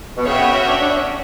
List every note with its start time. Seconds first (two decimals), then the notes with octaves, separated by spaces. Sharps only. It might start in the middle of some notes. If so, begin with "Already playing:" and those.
0.17 B2
0.26 C#3 F#4 C#5 E5 G5
0.40 B3
0.54 C#4
0.68 D4
0.81 D4
0.94 C#4